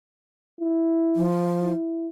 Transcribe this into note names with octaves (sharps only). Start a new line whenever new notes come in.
E4
F3
E4